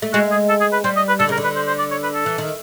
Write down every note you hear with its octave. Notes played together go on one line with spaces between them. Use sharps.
A3
G#3 F#4
G#4
A4
G#4
B4
G3 C5
D#5
B4
D3 A4
C#3 A#4
D3
B4
C5
C5
D5
C#5
B4
A4
E3
D#3